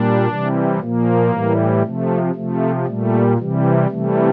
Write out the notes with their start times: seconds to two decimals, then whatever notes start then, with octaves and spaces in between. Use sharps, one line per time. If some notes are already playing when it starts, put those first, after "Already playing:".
Already playing: A#2 G3 D4
0.28 C3 E3 G3
0.79 A#2 F3 A#3
1.31 A2 E3 G3
1.83 C3 F3 A3
2.35 C3 F3 A3
2.86 A#2 G3 A3
3.37 C3 E3 G3
3.90 C3 E3 G3 A3